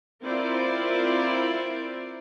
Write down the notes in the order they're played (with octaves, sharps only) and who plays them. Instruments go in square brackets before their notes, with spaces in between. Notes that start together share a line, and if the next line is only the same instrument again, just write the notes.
[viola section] C4 E4 F4 A#4 C5 D5